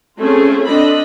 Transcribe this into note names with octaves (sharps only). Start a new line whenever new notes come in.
A3 C4 C#4 F4 G#4
C4 D4 A4 D#5 B5